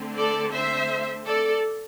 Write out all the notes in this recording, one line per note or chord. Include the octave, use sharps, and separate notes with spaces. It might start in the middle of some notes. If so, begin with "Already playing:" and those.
Already playing: D3 A3 C4
A4 D5
C5 E5
A4 D5